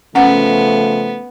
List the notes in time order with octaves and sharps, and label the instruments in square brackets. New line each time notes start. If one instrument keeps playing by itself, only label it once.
[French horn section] C#3 F3 A3 [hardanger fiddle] B3 [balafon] C#4 F#5